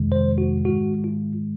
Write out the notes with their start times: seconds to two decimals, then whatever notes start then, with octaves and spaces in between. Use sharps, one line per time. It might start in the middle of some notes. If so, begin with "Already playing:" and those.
Already playing: F2 C3 D#3 G#3
0.12 C5
0.38 F#4
0.64 G#2 D#3 G#3 F#4
1.04 F4